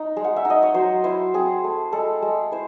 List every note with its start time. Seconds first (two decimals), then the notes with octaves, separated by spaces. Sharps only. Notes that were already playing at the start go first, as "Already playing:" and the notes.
Already playing: D#4
0.17 G#3
0.24 F#5
0.36 E5
0.45 D#4
0.50 D#5
0.63 C#5
0.74 F#3 C5
1.04 E4 C5
1.34 C4 G#4
1.64 A3
1.92 G#3 A4
2.22 G#3
2.52 E4 C5